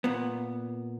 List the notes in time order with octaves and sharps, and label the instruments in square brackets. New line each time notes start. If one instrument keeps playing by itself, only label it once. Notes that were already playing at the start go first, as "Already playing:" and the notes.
[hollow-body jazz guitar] A#2 B3